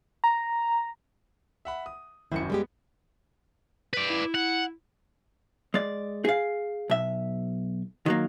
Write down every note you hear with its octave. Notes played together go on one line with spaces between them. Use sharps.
A#5
E5 F#5 B5
D#6
G#1 F#2 E4 C#7
G3 G#3 B3 G4
B4 D5
E4
F#5
G#3 D5
G#4 F5
B1 E5
D#3 F#3 A#3